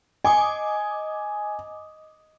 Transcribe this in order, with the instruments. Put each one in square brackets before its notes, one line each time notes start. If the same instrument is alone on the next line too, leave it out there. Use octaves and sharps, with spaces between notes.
[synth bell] D#5 D6 D#6 [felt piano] G#5